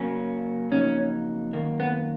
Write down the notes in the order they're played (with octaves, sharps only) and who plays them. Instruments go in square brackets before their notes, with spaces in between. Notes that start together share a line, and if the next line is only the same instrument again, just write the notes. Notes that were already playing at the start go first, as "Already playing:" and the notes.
Already playing: [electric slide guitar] C#3 F#3 A#3 C#4
[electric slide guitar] F2 C#3 F#3 A#3 D#4 [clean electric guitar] C#4
[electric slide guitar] F#2 D#3 A#3
[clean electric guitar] B3